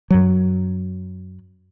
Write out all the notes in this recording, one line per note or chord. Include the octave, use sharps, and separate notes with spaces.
F#2 F#3